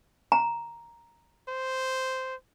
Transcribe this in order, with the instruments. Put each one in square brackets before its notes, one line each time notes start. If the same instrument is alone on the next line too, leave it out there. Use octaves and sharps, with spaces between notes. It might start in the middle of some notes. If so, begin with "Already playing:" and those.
[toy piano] A#5
[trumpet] C5